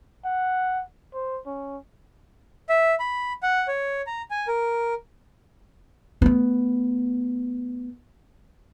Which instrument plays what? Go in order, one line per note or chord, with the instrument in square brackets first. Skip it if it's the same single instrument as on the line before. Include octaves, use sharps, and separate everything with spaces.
[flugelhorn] F#5
C5
C#4
[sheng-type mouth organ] E5
B5
F#5
C#5
A#5
G#5
A#4
[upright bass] A3 B3